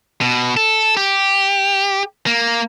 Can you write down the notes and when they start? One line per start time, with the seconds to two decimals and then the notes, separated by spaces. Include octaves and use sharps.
0.21 B2
0.57 A4
0.97 G4
2.26 A#3